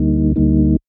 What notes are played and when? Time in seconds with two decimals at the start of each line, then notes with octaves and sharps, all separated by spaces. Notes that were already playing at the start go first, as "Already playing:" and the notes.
Already playing: D2 D3 G3 A#3 D#4
0.36 D2 D3 G3 A#3 D#4